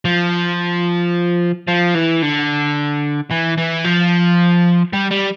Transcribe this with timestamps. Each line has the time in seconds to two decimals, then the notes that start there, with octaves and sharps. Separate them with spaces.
0.05 F3
1.67 F3
1.94 E3
2.22 D3
3.31 E3
3.58 E3
3.84 F3
4.93 G3
5.11 G3